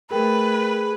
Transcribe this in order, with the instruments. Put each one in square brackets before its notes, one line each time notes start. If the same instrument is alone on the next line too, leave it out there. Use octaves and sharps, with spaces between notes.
[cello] A3 [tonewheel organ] G#4 [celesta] A#4 G5 [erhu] B4